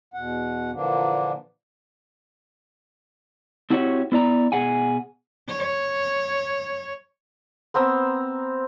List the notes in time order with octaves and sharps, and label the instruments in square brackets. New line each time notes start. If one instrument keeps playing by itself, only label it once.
[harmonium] E2 B2 F#5
A#2 D3 E3 F3 A#3 D4
[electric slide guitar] C4 E4 F#4 G4 C5 C#5
B3 E4 D5 A#5
B2 G#4 F#5 G#5
[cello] C#5
[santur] B3 C4 A#5 E6